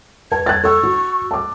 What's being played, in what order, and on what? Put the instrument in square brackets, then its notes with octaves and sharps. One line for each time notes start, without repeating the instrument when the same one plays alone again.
[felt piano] B4 A5 [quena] G#6
[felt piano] F#6 A6
[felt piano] A4 E6 [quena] C#6
[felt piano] F#4
A5 D6